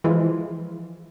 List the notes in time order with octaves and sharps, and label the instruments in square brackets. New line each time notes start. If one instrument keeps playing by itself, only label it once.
[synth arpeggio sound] E3 F3 G#3